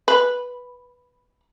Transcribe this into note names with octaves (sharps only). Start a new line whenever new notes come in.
B4